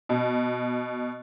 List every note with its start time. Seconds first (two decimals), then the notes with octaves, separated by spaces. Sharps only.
0.09 B2